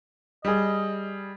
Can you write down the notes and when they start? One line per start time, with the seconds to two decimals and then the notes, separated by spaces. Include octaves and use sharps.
0.45 G3 G#4 D#5